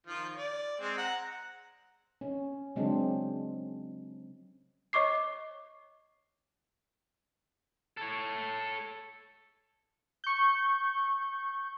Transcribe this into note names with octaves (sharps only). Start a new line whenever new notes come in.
D#3 F3 F4
D5
G#3 C4
F#5 A#5
C#4
C#3 F#3 G#3 C4 D4
C#5 D#5 C#6 D6 C7
A4 C#5
C#6 G6